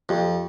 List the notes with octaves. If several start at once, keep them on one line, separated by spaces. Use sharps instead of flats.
F2 G4